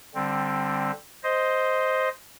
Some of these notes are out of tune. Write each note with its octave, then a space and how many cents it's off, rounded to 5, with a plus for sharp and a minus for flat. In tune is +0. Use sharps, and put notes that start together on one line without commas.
D3 +0 G3 +0 C4 +10
C5 +0 D#5 +5